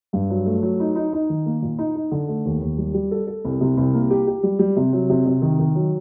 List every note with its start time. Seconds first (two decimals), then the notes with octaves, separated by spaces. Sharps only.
0.13 G2
0.30 F#3
0.46 A3
0.63 F#3
0.80 D#4
0.96 D#4
1.13 D#4
1.30 D#3
1.46 A#3
1.62 A#2
1.78 D#4
1.95 D#4
2.11 D3
2.28 A3
2.45 D#2
2.61 D#2
2.78 G3
2.94 G3
3.11 A4
3.27 A4
3.45 C2
3.61 C3
3.77 C2
3.94 A#3
4.11 G4
4.27 G4
4.43 G3
4.59 G3
4.76 C3
4.93 F#3
5.10 C3
5.26 C3
5.42 D#3
5.59 D#3
5.75 F#3